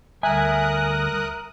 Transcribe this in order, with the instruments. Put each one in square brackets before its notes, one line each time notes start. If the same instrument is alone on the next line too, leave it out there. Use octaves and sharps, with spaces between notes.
[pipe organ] D2 D3 G3 [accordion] A#4 D#6 F#6 [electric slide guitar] E5 G#5